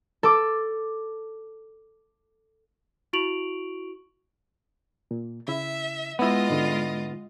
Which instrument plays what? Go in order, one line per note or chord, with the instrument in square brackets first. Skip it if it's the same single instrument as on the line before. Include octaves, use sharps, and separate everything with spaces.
[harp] A4 D6
[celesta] E4 F#4 C#6 D7 F7 F#7
[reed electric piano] A#2
[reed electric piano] C#3 E4 [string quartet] E5
[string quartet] G#3 F4 D#5 [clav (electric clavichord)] B3 E4
[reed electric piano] G#2 D3